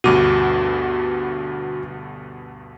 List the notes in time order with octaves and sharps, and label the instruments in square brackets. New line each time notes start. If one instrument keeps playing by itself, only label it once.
[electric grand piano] D2 G2 B2 [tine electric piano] F#4 D6